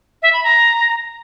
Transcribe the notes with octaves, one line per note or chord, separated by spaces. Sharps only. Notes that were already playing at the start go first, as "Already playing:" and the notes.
E5
B5
A#5